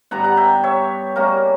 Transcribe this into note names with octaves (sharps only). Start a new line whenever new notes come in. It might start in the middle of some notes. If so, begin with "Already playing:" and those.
G2 D3 G3 B3 F#5 A#5
F#5 A#5
E5 G5
C#5 E5
C#3 G3 A#3 C#4 F#4 A#4